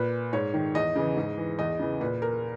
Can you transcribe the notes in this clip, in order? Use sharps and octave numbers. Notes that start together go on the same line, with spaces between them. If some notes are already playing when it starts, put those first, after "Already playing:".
Already playing: A#2 B4
G#2 C#5
D#3
E2 D#5
C#3 E3
G#2
E3
E2 D#5
C#3 E3
A#2 B4
A#4